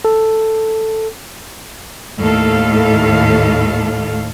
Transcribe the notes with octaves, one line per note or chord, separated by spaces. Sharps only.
A4
D#2 A2 A4 F5